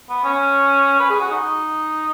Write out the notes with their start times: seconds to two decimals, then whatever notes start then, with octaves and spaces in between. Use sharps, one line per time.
0.09 B3
0.24 C#4
1.00 B4
1.10 G#4
1.20 F#4
1.31 D#4